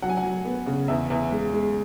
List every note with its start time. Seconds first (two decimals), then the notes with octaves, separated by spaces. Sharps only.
0.02 F#3 F#5
0.09 G#5
0.17 F#5
0.24 F#3
0.45 B3
0.66 C#3
0.88 E2 E5
1.10 E2
1.32 G#3
1.53 G#3